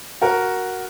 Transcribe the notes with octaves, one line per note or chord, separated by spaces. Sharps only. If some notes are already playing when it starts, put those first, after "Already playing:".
F#4 A#4